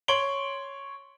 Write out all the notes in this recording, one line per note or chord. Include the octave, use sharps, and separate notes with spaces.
C#5 C6 D7 F#7 G7